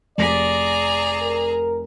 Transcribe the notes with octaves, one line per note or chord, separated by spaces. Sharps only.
F1 G#4 D5 A#5 A#6 B6
A#4